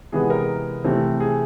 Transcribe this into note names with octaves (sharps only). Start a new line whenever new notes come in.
C3 E3 G#3 B3 G#4
A#4
C3 E3 A3 C4
G#4